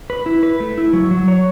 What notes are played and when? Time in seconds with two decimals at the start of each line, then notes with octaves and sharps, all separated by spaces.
0.10 B4
0.26 E4
0.43 B4
0.60 A3
0.78 E4
0.93 F#3
1.11 F#3
1.28 C#5